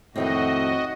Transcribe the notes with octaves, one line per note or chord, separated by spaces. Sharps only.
F2 A2 D#3 C4 F#4 D#5